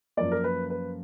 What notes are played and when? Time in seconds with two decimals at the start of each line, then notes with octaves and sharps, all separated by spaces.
0.17 F#2 F3 A#3 D5
0.32 A#4
0.44 B4
0.70 B4